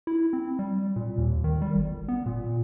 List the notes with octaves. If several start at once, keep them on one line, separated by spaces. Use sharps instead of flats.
E4
C4
G3
A#2
D#2
D#3
G3
G1
B3
A#2